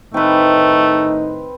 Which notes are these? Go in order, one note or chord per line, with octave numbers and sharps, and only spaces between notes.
A2 D#3 A3 C4 D#4 B4